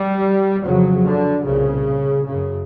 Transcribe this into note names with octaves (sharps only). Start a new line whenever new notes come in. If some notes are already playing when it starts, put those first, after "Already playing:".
Already playing: G3
F2 C#3 F#3
D3
C2 A#2 C#3
F#2 C#3